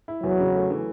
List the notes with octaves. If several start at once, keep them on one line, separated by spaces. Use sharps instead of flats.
E4
E2 F#3
C#3
A3
E3